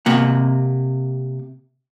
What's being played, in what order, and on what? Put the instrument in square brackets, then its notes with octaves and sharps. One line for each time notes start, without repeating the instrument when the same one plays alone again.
[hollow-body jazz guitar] C3 A#3 F#5